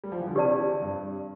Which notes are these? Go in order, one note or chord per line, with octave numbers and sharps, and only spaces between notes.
G3
F3
E3
D3
C3 G4 D5 A5
G2